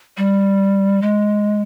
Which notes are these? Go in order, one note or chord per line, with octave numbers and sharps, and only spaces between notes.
G3
G#3